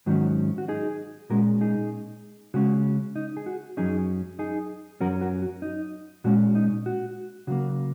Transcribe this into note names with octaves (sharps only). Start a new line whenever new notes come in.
G#2 D#3 F#3 C#4 F#4
F#4
D#4 G#4
A#2 G#3 C#4 F#4 A#4
D#4 G#4
C#3 G#3 C#4 F#4
D#4
G#4
F#4
F#2 F#3 C#4 D#4 G#4
D#4 G#4
F#2 F#3 C#4 F#4 A#4
F#4 A#4
F#4
D#4
A#2 G#3 C#4 F#4
D#4
F#4
C#3 F#3 A#3 F#4